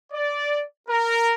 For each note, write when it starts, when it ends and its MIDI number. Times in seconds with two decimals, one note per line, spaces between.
0.12 0.63 74
0.88 1.33 70